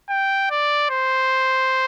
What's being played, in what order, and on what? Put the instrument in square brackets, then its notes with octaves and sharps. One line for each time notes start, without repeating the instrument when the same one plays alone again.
[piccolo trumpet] G5
D5
C5